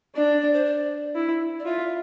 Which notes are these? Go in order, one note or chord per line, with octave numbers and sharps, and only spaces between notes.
D4 D5
D5
C5
D5
E4
D5
F4 E5